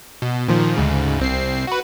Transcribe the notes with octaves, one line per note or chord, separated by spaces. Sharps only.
B2
A#2 D#3 F3
D2 G#2 C#3
C2 C4 C7
F#4 B4